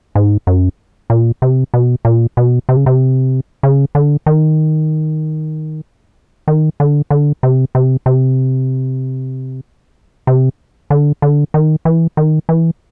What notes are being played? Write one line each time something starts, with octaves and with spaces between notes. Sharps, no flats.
G#2
F#2
A#2
C3
B2
A#2
B2
C3
C#3
C3
C#3
D3
D#3
D#3
D3
D3
C3
C3
C3
C3
D3
D3
D#3
E3
D#3
E3